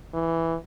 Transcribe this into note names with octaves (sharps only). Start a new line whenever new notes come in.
E3